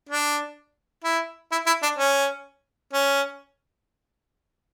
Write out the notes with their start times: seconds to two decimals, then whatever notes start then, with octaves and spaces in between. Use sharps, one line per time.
0.09 D4
1.04 E4
1.52 E4
1.67 E4
1.83 D4
1.99 C#4
2.93 C#4